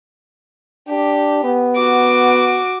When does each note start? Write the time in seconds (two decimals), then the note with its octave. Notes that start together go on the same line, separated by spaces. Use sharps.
0.88 D4 G4
1.44 B3
1.76 F#4 D6